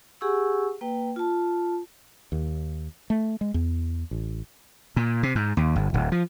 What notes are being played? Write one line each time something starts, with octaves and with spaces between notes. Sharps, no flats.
G4 G#4 F#5 G#5 C#6 E6
A#3 B4 G5
F4 A5
D#2
A3
G#3
E2
A1
A#2
C3
G#2
D#2
G1
D1
F3